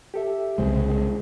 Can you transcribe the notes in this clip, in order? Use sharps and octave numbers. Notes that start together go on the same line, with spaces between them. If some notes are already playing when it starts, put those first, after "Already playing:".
G4 A4 E5
C2 C#3 G#3 G#4 C5